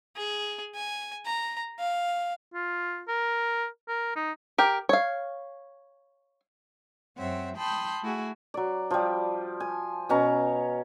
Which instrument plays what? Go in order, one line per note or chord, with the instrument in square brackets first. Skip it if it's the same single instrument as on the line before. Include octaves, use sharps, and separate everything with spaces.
[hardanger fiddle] G#4
G#5
A#5
F5
[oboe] F4
A#4
A#4
D#4
[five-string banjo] G4 A#4
C#5 F5
[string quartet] F#2 C4 C5 C#5 E5 F#5
G5 A5 B5 C6 D#6 G6
A3 E4 F#4 G#4
[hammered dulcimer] F#3 D5
F3 G3
G#5
B2 C#4 A#5